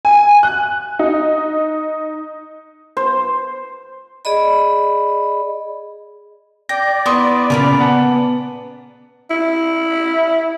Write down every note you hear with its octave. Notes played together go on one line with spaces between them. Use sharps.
G#5
F#6
D#4
C5
G#4 D5 D#5 B5
D5 G5 A#6
B3 E4 C6 C#6 D#6
A#2 C#3 G#4 A#4 B5
B3 F#5 A5
E4